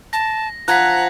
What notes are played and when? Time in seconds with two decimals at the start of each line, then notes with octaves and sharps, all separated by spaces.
0.13 A5 A#6
0.68 F3 F#5 A#5 F#6 G#6 B6